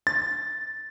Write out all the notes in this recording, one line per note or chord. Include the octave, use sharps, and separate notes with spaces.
A6